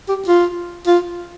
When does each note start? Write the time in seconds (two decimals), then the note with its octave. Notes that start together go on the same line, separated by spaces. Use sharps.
0.08 G4
0.28 F4
0.87 F4